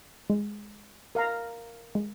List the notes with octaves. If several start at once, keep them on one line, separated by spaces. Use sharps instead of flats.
G#3
A#4 F5 A#5
G#3